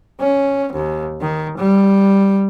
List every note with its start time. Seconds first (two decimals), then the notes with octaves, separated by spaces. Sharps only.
0.20 C#4
0.73 D#2
1.21 D#3
1.58 G3